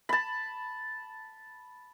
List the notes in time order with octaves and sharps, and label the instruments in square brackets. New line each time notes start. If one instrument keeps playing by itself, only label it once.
[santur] A5 B5